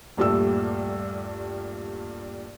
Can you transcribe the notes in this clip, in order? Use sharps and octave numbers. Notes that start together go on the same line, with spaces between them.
D#1 G2 A#2 G3 A3 E6